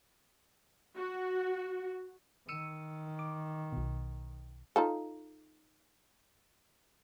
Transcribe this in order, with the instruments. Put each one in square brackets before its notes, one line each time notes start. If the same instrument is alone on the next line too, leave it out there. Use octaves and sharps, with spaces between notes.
[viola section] F#4
[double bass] D#3 [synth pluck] E6 C#7 D#7
[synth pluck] D6
B1 B2
[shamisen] D#4 F4 A4